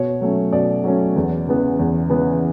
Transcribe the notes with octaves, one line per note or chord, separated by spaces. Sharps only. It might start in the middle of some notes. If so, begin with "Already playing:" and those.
Already playing: B2 C#5
F#3 A3 C#4
B2 D5
F#3 A3 C#4
E2
C#3 E3 B3
E2
C#3 E3 B3